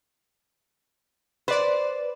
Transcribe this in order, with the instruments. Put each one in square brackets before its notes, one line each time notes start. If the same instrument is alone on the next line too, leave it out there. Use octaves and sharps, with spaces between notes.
[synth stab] B4 D5 [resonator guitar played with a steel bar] C5